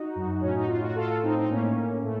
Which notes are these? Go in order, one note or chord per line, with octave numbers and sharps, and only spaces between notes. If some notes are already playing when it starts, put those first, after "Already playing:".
Already playing: D#4 F#4
F#2
A2 C#4
D#4
A2 F4
F#4
A2 F4 A4
A2 C4 D#4
D#4
A2 A#3 C#4
A2
A2 A3